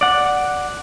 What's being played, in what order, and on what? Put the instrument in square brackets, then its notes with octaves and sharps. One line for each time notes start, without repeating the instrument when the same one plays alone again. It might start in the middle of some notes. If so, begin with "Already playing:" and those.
[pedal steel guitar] D5 F#5